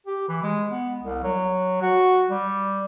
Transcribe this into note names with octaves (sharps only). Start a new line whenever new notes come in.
G4
E3
G#3
B3
C2
F#3
F#4
G3